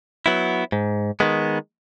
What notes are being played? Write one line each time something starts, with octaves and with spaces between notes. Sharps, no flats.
F#3 B3 E4
G#2
D#3 G#3 B3